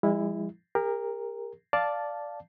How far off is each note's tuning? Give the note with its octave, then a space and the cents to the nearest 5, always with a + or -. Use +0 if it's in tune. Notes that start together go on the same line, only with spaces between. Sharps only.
F3 +0 G#3 -35 E4 +0
G4 +45 A#4 +0
D5 +0 F5 +0 A5 -5